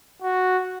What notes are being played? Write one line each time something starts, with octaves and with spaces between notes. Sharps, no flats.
F#4